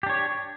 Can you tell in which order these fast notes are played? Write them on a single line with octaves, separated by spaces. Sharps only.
G4 D4 C#5